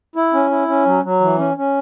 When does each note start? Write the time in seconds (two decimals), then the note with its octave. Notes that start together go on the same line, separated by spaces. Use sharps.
0.16 E4
0.33 C#4
0.51 E4
0.68 C#4
0.86 F#3
1.03 F#3
1.21 E3
1.38 C#4
1.57 C#4